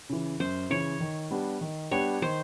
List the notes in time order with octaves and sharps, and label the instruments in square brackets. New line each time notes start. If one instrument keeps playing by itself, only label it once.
[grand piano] C#3 E3
[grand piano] F#2 [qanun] C5
[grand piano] C#3 E3 [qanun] C#5
[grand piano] D#3
G3 B3 D4 G4
D#3
[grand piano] G3 B3 D4 G4 [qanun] C#5
[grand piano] D#3 [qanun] C5